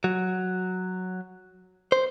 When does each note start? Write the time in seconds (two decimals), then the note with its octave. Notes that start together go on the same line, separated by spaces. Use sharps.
0.04 F#3
1.92 C5